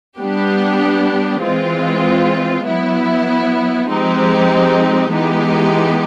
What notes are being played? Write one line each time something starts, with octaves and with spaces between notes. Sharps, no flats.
G3 B3 D4 G4
E3 G#3 C4 F4
F#3 B3 E4
F3 G#3 C4 D#4 G4
E3 G#3 B3 D#4 G4